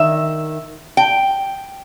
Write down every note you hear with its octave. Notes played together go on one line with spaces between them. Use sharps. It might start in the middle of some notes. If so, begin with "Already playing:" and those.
Already playing: D#3 E5
G5